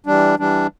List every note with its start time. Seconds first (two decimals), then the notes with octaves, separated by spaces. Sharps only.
0.06 E3 G3 D4
0.39 E3 G3 D4